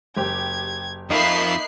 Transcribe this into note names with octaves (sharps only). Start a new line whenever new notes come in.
F#1 G4 G#6
F2 A#3 D#4 F4 E5 B5 F#6 C7